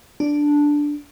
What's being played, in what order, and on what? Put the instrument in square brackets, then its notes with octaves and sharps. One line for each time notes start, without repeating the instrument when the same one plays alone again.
[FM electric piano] D4